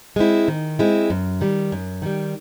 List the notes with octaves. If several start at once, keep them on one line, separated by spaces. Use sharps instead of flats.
G#3 C4 E4
D#3
G#3 C4 E4
F#2
D#3 G3
F#2
D#3 G3